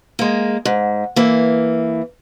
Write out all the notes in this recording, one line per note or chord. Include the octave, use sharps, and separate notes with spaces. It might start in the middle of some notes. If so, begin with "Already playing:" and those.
G#3 A#3
G#2
E3 A#3